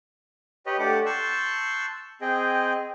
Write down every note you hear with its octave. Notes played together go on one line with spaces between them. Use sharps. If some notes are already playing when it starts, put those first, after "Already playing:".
G4 B4 C#5 D#5
A3 D4 G4 A4 F#5 D6
A5 C6 C#6 E6 F#6 G6
C4 G#4 D#5 G5